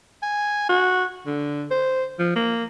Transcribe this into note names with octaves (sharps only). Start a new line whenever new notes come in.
G#5
F#4
D3
C5
F3
A#3